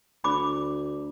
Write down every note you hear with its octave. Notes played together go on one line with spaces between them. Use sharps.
D2 B5 D6